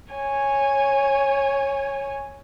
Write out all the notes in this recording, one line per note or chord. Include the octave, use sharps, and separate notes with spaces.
C#5 G#5